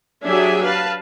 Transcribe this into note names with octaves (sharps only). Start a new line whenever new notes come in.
F#3 D4 G4 G#4 E5 G#5
B4 F5 A5